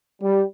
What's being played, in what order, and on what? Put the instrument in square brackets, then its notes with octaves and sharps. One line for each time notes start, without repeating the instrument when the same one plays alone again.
[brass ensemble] G3